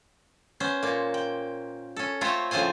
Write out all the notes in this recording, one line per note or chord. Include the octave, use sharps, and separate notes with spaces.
B3 C#4 C5
A#2 A#3
G5
C#4 A4
A3 C4 F4 C5 C#5 E5
A2 C#3 F3 F4 C5 G#5